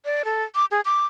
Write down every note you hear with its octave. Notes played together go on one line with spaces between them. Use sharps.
D5
A4
D6
G#4
D6